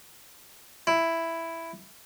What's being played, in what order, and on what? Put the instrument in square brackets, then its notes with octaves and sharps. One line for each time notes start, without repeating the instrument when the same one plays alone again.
[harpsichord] E4